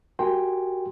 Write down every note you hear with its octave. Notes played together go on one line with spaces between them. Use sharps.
F#4 G4 A#4 G5 G#5 C6